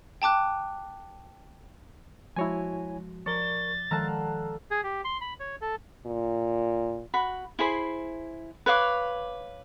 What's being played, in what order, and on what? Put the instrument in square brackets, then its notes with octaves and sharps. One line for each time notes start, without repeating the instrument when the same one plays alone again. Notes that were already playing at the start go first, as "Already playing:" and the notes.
[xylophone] G5 A5 D6 F#6
[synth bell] F3 G#3 F#4 [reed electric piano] E4 C#5 G#5
[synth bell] F3 G7 [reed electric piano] A#4 C#6 [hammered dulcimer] D5 [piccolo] A6
[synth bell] D#3 F3 G#3 [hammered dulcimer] A4 F5 F#5 [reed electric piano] A5 A#5
[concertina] G#4
G4
C6
B5
C#5
A4
[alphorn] A#2
[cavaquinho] F#4 B5
E4 G#4 C5 B5
B4 C#5 F5 D6